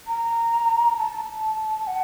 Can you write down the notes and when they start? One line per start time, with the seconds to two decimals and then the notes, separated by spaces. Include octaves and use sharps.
0.07 A#5
0.97 A5
1.87 F#5